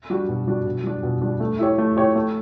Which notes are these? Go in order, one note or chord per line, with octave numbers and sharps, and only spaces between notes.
G3 D4 F#4
B2
G3 D4 F#4
B2
G3 D4
B2
G3 D4
A3
E4 G4 C#5
A3
E4 G4 C#5
A3